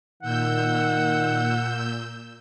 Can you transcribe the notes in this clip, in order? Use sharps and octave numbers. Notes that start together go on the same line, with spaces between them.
A#2 D#3 F#5 E6 G6